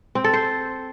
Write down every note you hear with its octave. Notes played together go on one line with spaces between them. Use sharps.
C4
A4
C5